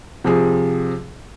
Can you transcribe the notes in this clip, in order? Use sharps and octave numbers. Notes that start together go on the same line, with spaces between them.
C3 F3 G#4